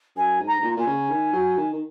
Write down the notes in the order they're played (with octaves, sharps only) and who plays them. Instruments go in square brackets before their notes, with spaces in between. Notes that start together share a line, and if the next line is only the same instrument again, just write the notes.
[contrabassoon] F#2 [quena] G#5
[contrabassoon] G#2
[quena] A#5
[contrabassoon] G#2
A#2
[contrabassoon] A#2 [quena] G#5
[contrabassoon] C#3
D#3
F#3
D#3
D#3